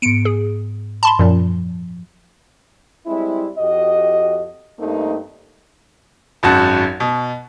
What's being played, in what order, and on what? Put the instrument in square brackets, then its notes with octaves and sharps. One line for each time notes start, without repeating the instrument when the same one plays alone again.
[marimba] G#2 B3 [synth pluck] C#7 D7
[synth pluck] G#4
A5 B5 C6
[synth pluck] F#2 A#2 [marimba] F3
[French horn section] G3 G#3 C4 E4
F2 F#4 G4 D#5
G2 A3 A#3 C4 D#4
[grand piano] G#1 F#2 F#4 A5
B2